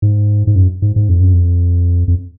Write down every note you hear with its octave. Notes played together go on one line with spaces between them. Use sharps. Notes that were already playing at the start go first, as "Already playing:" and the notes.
G#2
G#2
F#2
G#2
G#2
F2
F#2
F2
F2